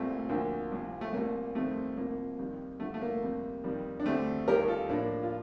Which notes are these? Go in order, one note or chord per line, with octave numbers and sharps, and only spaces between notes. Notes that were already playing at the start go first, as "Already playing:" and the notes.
Already playing: C2 A#2 G3 A3 C4
D2 D3 F3 A#3
C2 C3 F3
A3
C2 A#2 G3 A#3
F2 D#3 G3 A3 C4
C2 C3 F3 A#3
F2 D#3 G3
G2 D3 F3 A3
A3
A#3
F2 C3 G3
F2 D#3 G3
D4
D2 D3 G3 A3 C4
D#2 D#3 G3 G4 A#4
F4 A4
A2 F3 A#3 D4
F4